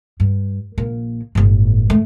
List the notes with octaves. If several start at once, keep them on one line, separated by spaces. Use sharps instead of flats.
G2
A#1 A#3
G1 A2
A3